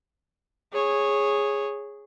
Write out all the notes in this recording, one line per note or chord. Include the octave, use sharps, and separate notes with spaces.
G#4 C#5